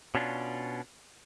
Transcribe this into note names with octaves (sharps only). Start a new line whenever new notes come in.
B2 C#4 D4 F4